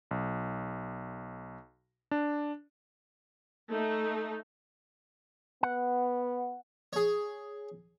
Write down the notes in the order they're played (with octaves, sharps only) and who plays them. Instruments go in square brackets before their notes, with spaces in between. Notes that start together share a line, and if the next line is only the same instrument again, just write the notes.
[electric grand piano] B1
D4
[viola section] A3 D#4
[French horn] B3 [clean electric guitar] F#5
[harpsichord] G#4 C#5